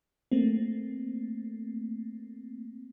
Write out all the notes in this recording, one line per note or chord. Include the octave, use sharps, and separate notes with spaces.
A3 A#3 C4